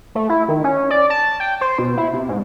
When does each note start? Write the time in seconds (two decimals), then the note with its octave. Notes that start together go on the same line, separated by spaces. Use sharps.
0.15 A3
0.29 E4
0.48 D#3
0.64 C#4
0.91 D5
1.10 A5
1.40 G5
1.61 C5
1.78 B2
1.98 E4
2.13 C3
2.29 G#2